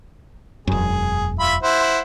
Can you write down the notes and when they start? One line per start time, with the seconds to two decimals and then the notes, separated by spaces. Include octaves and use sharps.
0.67 E1 F#2 G#4
1.39 F4 E5 B5
1.63 E4 C5 F#5